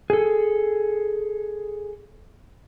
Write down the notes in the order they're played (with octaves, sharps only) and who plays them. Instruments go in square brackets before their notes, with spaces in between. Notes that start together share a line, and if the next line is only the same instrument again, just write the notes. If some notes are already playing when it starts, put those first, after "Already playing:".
[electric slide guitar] G#4 A4